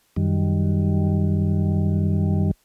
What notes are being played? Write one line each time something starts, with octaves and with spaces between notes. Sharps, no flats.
F#2 D#3 G3